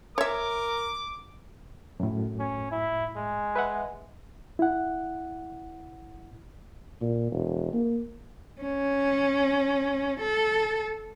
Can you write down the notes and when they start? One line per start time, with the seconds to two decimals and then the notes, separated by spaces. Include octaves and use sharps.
0.18 A#4 C#5 E5 D6
2.00 F#2 A2
2.39 C#4
2.71 E4
3.16 G#3
3.56 B4 E5 F#5
4.59 E4 F#5
7.01 A#2
7.31 E1
7.73 A#3
8.61 C#4
10.20 A4